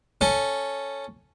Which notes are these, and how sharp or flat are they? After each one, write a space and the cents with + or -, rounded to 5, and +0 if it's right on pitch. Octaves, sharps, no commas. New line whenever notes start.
C#4 +0 A4 +0